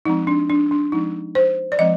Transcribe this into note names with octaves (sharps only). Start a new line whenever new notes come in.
F3 G#3 C4 D#4
D4
D4
D4
F3 G#3 C4 D#4
C5
D5
F3 G#3 C4 D#5